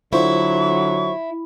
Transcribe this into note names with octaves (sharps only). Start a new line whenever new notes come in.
D3 F#3 E4 F4 C5 C#6